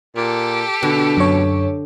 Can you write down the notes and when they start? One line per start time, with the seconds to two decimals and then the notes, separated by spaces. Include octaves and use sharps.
0.16 A#2 G4 A4
0.83 B2 D3
1.17 F#2 C#5